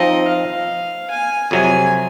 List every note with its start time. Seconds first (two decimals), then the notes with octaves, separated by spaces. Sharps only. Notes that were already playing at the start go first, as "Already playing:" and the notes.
Already playing: F3 C4 D#4 D#5
0.28 F5
1.10 G#5
1.51 F2 C3 F#3 G#5